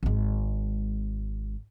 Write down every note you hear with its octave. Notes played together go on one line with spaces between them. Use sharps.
G#1 G#3